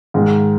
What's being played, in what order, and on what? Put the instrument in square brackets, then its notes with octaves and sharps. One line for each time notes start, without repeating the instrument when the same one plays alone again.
[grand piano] G#2 D#3 G#3